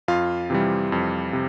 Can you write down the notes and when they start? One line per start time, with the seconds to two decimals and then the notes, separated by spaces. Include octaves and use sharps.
0.08 F2 F4 F5
0.50 C3 E3 G3
0.92 F2
1.33 C3